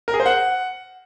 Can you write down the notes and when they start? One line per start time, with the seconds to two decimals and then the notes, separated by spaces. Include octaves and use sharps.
0.08 A#4
0.14 G#4
0.20 C5
0.26 F#5